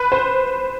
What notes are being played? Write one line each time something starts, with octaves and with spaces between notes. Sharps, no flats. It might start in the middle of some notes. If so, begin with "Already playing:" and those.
Already playing: B4
C5